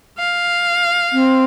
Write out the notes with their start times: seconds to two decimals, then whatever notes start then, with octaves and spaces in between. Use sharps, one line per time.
0.19 F5
1.13 C4